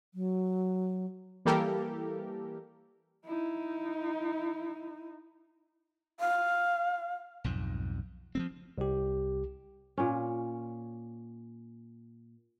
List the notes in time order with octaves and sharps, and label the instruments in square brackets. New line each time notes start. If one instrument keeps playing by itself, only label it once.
[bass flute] F#3
[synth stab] E3 G3 A#3 G4 A4 A#4
[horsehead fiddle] D#4 E4
[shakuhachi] F5
[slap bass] B1 F2 G#2
F3 G3 C4
[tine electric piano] C2 G4
[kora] A#2 C#4